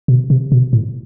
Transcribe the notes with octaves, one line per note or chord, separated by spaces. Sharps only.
B2
C3
B2
A2